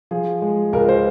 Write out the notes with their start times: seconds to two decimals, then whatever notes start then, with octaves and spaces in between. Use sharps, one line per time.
0.11 F3 G#4
0.42 G#3
0.73 C#2 A#4
0.89 C5